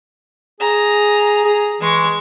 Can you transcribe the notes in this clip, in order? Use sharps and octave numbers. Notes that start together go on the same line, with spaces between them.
G#4 A#5
G#4
E3 G#3 C#6